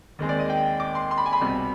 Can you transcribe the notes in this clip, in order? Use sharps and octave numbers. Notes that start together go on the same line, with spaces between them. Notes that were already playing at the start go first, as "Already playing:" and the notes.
D#2 D#3 G#3 C4
D5
D#5
G5
D6
C6
C6
B5
G#5
B5
C2 B2 G3 C4